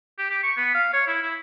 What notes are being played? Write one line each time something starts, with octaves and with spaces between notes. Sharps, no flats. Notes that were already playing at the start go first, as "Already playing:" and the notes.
G4
G4
C#6
B3
F5
C#5
E4
E4